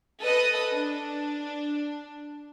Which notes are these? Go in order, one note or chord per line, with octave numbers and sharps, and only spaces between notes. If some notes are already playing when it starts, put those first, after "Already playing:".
A4 B4 D#5 D#6
D4